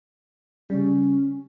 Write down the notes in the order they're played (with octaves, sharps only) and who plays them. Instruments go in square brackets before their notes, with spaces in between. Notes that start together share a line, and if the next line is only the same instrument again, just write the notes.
[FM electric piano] C#3 G3 [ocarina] C#4